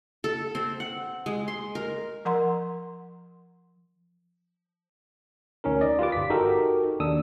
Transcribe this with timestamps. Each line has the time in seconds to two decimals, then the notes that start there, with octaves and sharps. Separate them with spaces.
0.24 A4
0.55 C4
0.80 F#5
1.26 G#3
1.48 C6
1.75 A#4
2.25 F3 A#4 F#5 A#5 C6
5.64 D2 C#4 D#4 A#4
5.81 D5 D#5
5.99 F4 G4 B4 D6
6.12 G1 B6
6.30 D#4 F#4 G4 A4 A#4
7.00 D#2 D4 D#6 E6